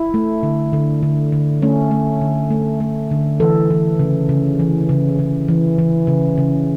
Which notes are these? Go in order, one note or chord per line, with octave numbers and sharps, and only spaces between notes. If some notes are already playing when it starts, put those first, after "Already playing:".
Already playing: E4
A3
D3
D3
D3
D3
A3 C#4
A3
D3
A3
A3
D3
E3 A4
E3
C#3
C#3
E3
C#3
C#3
E3
E3
C#3
C#3